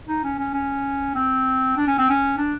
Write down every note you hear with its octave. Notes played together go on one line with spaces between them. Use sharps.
D#4
C#4
C#4
C#4
C4
D4
C#4
C4
C#4
D4